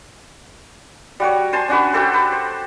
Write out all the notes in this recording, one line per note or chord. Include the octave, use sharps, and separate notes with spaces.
G3 F#4 C#5
C5 G#5 A5 C6
C#4 D4 F#4 B4
F#4 G4 A4 C5
B4
C5